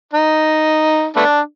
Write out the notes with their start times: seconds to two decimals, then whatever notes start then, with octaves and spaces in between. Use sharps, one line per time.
0.13 D#4
1.16 A3 B3 D4